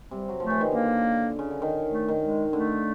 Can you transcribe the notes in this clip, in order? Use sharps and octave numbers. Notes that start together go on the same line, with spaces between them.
C3 G3
F#3
F3 A3
E3
D#3
D3 A#3
C#3
D3
D#3
A3
D#3
G#3
D3 A3